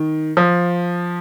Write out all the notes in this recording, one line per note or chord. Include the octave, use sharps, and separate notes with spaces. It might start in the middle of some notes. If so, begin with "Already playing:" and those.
Already playing: D#3
F3